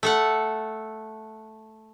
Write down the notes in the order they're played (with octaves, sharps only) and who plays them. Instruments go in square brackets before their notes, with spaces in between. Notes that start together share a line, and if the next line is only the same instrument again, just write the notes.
[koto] A3 A4 F#5